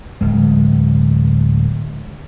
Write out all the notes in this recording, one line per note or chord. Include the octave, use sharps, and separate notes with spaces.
D1 G#3